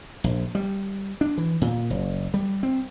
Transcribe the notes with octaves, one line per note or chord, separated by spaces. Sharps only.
A#1
G3
D4
E3
A#2
F#1
G3
C4